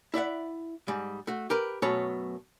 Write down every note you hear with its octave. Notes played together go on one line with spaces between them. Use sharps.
E4 D5 E5 F#5
G#2 G3
A3 F#4
G4 A#4 B4
F#2 B2 A3 A4 C#5 B5